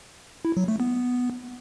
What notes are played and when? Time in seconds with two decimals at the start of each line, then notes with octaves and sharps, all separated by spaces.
0.45 E4
0.57 F#3
0.68 A3
0.80 B3